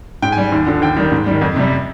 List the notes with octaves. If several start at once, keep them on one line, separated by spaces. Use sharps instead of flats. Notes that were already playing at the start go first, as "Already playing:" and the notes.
G#2 G5
G#5
G3
D#2
D3 F3
D#2 G5
D#3 G3
G#2
D#3 G3
F2
C3 G3